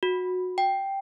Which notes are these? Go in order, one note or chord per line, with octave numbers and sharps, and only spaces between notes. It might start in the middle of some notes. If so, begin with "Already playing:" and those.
F#4
G5